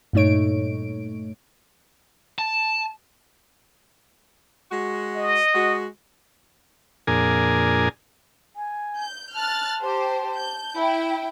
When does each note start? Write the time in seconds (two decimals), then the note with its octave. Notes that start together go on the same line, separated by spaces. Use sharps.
0.13 G2 A#2 A3 D#4 C#5 D7
2.38 A5
4.71 G#3 F#4
5.16 D#5
5.53 G#3 F#4
7.07 F2 A#2 D4 G#4 A#4 G#5
8.56 G#5
8.98 G6
9.35 A5 F6 F#6 A6
9.82 G4 C5
10.38 G6
10.77 E4 G5